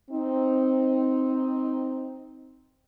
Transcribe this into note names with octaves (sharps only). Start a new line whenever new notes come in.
C4 D#4